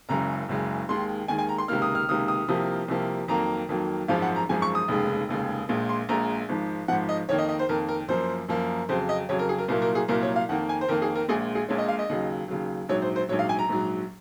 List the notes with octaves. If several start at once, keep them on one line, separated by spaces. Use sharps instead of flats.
F#1 F#2 C#3 G#3 A#5
F#1 F#2 C#3 G#3
D#2 D#3 G#3 C6
D#2 D#3 G#3 G#5
G#5
A#5
C6
C#2 C3 D#3 A#3 F6
D#6
F6
C#2 C3 D#3 A#3 D#6
D#6
C2 C3 F3 A#3 D#6
C2 C3 F3 A#3
F2 D#3 F#3 A#3 A#5
F2 D#3 F#3 A#3
G#1 F#2 F3 G#3 F5
F#5
A#5
G#1 F#2 F3 G#3 G#5
C#6
D#6
F1 D#2 C#3 G#3
F1 D#2 C#3 G#3
A#1 A#2 G#3
C6
A#1 A#2 G#3 A#5
G#1 G#2 F3
G#1 G#2 F3 F#5
D#5
F2 D#3 A#3 C#5
D#5
D#5
C5
F2 D#3 A#3 A#4
A#4
F#2 F3 A#3 C5
F#2 F3 A#3
F2 C#3 F#3 C5
D#5
F2 C#3 F#3 C#5
A#4
G#4
A#4
C2 A#2 F#3 A#3 A#4
A#4
G#4
C2 A#2 F#3 A#3 A#4
C#5
F5
F2 D#3 A#3 F#5
G#5
C5
F2 D#3 A#3 A#4
G#4
A#4
A#1 A#2 G#3 G#4
G#4
A#1 A#2 G#3 C#5
D#5
F5
D#5
D#2 C#3 F#3
D#2 C#3 F#3
A#1 G#2 F#3 C#5
C5
C5
A#1 G#2 F#3 C#5
F5
G#5
A#5
A#1 G#2 F#3